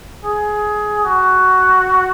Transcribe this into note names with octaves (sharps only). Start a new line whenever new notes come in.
G#4
F#4